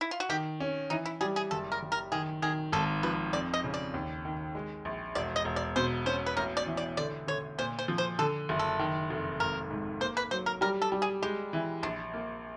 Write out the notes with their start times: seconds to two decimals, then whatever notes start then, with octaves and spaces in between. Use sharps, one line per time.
0.01 E4
0.11 F4
0.20 F#4
0.29 D#3 G4
0.60 C#4
0.90 E3 D#4
1.06 E4
1.21 G3 G#4
1.36 G#4
1.51 F#1 A4
1.72 A#4
1.82 F#1
1.92 A#4
2.12 D#3 G#4
2.42 D#3 G#4
2.72 G#1 A4
3.03 F3 B4
3.33 F2 D5
3.54 D#5
3.64 C#3
3.74 D5
3.94 D#2
4.25 D#3
4.55 G#3
4.85 A#1
5.15 E1 D5
5.36 D#5
5.45 E1
5.56 D5
5.76 B2 C5
6.06 C#4 C5
6.26 B4
6.37 A1 A#4
6.57 D5
6.67 E3
6.77 D5
6.97 D3 D5
7.27 D3 C#5
7.58 A#2 C5
7.79 C5
7.88 F3
7.98 C5
8.19 D3 A4
8.49 F#1
8.59 A4
8.79 D#3
9.10 F1
9.40 G#1 A#4
9.71 G#2
10.00 A#3 C5
10.17 B4
10.31 F#3 C5
10.46 A#4
10.61 G3 A#4
10.82 A4
10.92 G3
11.02 G#4
11.22 G#3 G4
11.53 E3
11.83 A#1 D4
12.13 A#3